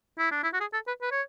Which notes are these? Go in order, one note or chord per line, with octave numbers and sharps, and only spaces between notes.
E4
D4
E4
F#4
G#4
A4
B4
B4
C#5